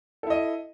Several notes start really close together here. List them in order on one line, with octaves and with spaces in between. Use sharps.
A4 E4 D#5